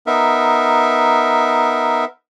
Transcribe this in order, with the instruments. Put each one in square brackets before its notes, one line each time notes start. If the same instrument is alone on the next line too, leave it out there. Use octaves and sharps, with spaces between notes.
[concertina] B3 D#4 A#4 E5